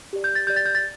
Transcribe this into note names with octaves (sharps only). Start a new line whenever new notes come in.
G4 D5
G6
A6
G4 D5 G6
A6
G6
A6